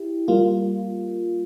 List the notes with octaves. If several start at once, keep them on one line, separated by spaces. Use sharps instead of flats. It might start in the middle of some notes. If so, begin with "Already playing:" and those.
Already playing: E4 G4
G3 A#3 F4